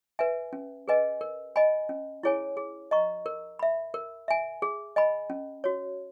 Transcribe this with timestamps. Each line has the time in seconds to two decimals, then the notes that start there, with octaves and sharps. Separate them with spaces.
0.19 B4 E5 G#5
0.53 C#4
0.88 G#4 B4 D#5 G#5
1.21 A#4
1.56 D#5 G#5 B5
1.89 C#4
2.23 E4 G#4 C#5 G#5
2.57 G#4
2.91 D#5 A#5 C#6
3.26 A#4
3.59 E5 B5
3.94 A#4
4.28 E5 G#5
4.62 G#4
4.96 D#5 G#5 B5
5.30 C#4
5.64 F#4 C#5